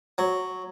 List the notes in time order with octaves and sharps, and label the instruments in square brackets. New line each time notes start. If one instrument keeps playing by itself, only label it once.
[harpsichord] F#3